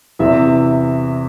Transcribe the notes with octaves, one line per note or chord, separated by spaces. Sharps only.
E2 C3 E3 E5